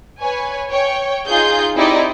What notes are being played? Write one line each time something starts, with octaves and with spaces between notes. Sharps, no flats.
B4 C#5 G#5
C#5 G5
D#4 F4 G#4 G6
C4 D#4 E4 G4 D5 D#5